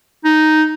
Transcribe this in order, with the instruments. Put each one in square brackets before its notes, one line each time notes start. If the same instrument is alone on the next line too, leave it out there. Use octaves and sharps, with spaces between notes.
[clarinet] D#4